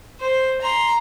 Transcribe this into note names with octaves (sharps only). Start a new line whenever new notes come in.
C5
A#5 C6